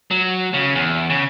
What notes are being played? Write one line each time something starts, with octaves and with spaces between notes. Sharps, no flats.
F#3
C#3
E2
C#3